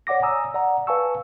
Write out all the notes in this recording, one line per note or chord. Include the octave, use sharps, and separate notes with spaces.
C#5 D5 F#5 D6 A#6
G#5 A#5 D#6 E6
D5 F#5 A#5
B4 F5 G#5 A5 C#6 E6